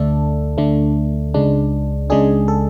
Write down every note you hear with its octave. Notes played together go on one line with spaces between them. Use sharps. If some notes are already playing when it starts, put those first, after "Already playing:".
Already playing: D2 D3 A3 D4 A4
D2 D3 A3 D4
C#2 C#3 G#3 D4
C#2 C#3 G#3 D4 G#4
A4